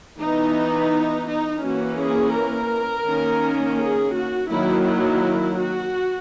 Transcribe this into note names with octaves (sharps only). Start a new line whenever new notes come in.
E3 B3 D#4
D#4
E3 A#3 C#4 F#4
G#4
A#4
D#3 A#3 C#4
G#4
F#4
D#3 F#3 A#3 E4
E4
F#4